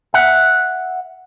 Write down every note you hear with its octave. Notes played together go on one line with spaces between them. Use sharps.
E5 F#5